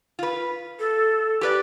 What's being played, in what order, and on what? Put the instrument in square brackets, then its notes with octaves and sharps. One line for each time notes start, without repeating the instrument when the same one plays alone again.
[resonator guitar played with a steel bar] F4 B4
[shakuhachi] A4
[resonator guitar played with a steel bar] G4 B4 D5